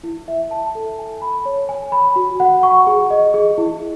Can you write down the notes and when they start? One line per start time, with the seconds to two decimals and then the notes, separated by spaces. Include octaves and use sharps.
0.03 E4
0.28 E5
0.51 A5
0.75 A4
0.98 G#5
1.22 B5
1.45 C#5
1.69 G#5
1.92 B5
2.16 F#4
2.40 F#5
2.63 C#6
2.87 G#4
3.10 D#5
3.34 G#4
3.58 E4